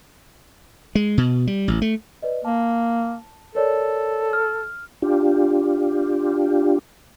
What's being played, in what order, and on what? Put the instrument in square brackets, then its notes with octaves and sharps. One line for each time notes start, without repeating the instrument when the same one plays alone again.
[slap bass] G#3
B2
G3
A1
A3
[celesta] B4 D5 D#5
[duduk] A#3 [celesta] A5
[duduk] A4 [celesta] A#4 C#5 D5
[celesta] F6
[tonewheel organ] D4 F4 G4